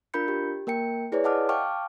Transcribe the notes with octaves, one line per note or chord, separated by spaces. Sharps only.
D4 F4 A#4 B5 G6 C#7
G4
A#3 A#4 G5 C#7
E4 G#4 B4 C#5 D5
D#5 F#5 A5 D6 F6
F5 G5 A5 C#6 D6 F6